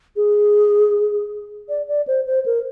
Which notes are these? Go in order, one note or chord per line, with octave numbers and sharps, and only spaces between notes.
G#4
D5
D5
C5
C5
A#4